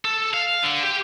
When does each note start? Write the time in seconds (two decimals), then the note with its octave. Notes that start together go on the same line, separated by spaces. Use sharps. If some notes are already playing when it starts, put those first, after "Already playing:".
0.05 A4
0.34 F5
0.63 D3
0.83 G4